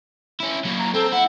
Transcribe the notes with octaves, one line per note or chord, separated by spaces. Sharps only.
C#4 E4
F#3 A#3
A#5
C4 A4
E4 F#5